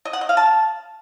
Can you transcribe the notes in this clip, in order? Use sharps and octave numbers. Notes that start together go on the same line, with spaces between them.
D#5
F#5
D#5
F5
A5